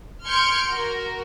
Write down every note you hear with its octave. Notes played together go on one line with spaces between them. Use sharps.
C6 F6 G6 G#6 C#7 D7
F#4 A#4